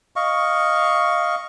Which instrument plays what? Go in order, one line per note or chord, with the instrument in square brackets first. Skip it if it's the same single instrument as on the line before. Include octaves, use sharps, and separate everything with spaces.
[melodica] D#5 F5 C#6